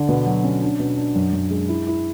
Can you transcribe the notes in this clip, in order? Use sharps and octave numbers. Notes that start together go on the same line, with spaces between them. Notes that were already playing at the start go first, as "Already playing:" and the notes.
Already playing: D3
B2
F#3
C#4
D4
B2
D4
F#2
F#2
G#3
E4
E4